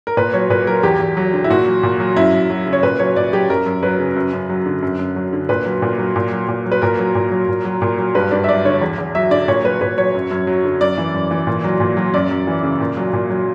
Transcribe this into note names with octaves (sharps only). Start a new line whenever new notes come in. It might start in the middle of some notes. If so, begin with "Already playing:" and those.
A#4
A#2 B4
F#3 C#5
A#2 B4
F#3 A#4
E2 G4
E2
F#3
D3
E4
A#2 F#4
F#3
A#2
F#3
F#2 E4
F#2
F#3
C#3
C#5
A#2 B4
F#3 C#5
A#2 D5
F#3 G4
F#2 A#4
F#2
F#3 B4
C#3
F#2
F#2
F#3
D3
F#2
F#2
F#3
D3
A#2 B4
F#3
A#2
F#3
A#2
F#3
A#2
F#3
B4
A#2 A#4
F#3
A#2
F#3
A#2
F#3
A#2
F#3
G2 B4
G2 D5
E5
F#3 D5
D3 C#5
E2
E2
F#3 E5
D3 D5
A#2 C#5
F#3 B4
A#2 B4
F#3 C#5
F#2
F#2
F#3
D3
F#2 D5
E3
F#2
E3
A#2
F#3
A#2
F#3
F#2 D5
F#2
E3
C#3
A#2
F#3
A#2
F#3